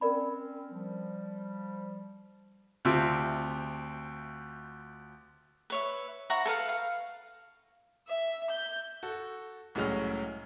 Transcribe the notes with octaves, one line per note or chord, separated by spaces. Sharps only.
C4 C#4 A#4 D5 B5
F3 G3
D2 C4 F4 G4 E5
B4 C#5 E5
E4 F#5 A#5 C#6
A4 B4 F5 F#5
F5
E5
G6
F#4 A4
C2 A2 F#3 G#3 C#4 F6